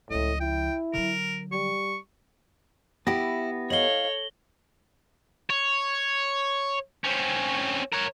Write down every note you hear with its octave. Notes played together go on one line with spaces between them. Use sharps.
C#2 A2 F3 D#5
E4 G5
D3 F#3 A#4
G3 C#6
B3 E4 G4 A#6
A4 C#5 D#5 F5 F#7 G7
C#5
C4 C#4
A#4 C#5